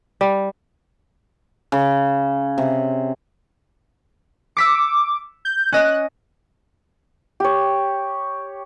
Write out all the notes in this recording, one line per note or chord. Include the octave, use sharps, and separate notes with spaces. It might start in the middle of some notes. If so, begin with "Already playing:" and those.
G3
C#3
C3
D6 E6 B6 C#7
G6
C#4 D#5 F#6
G4 C#5